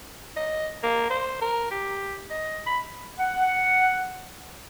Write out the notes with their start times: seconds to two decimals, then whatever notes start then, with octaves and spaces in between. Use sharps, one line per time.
0.37 D#5
0.83 A#3
1.10 C5
1.41 A#4
1.71 G4
2.30 D#5
2.66 B5
3.19 F#5